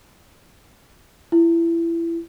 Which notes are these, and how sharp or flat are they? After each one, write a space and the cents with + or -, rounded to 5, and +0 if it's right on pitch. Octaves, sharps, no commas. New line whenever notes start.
E4 +25